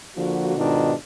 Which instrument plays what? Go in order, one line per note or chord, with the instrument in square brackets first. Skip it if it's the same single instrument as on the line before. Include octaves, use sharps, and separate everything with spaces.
[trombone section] D3 F3 A#3 F#4
G#2 B2 D#3 D4 F4